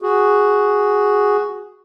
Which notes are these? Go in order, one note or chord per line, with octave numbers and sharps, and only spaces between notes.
F#4 G#4